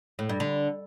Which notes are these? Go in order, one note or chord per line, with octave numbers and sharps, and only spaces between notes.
A2
G2
D3